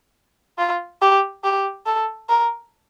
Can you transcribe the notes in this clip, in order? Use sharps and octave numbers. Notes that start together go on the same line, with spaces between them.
F4
G4
G4
A4
A#4